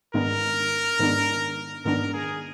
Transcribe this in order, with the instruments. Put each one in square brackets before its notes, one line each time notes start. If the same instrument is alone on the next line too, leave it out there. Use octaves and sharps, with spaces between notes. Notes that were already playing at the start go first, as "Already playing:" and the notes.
[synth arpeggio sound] G#2 D#3 G#3 B3 D4 [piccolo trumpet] A#4
[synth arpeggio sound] G#2 D#3 G#3 B3 D4
[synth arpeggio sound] G#2 D#3 G#3 B3 D4 [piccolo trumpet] A#4
[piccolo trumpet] G#4